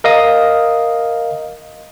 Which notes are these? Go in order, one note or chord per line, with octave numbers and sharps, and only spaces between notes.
A#4 D#5 F5 D#6